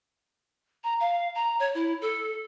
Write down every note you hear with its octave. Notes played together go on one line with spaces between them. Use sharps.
A#5
F5
A#5
C#5
E4
A4